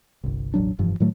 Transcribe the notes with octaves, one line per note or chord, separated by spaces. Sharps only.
G1 C2
E1 A1 F#3 D4
F1 G2 E3 F3
A2 D#3 F#3 A3